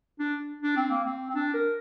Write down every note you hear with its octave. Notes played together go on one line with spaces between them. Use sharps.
D4
D4
C4
A#3
C4
C4
D4
A#4